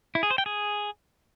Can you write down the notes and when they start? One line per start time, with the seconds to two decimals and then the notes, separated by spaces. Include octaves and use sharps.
0.15 E4
0.23 G#4
0.31 C5
0.38 G5
0.46 G#4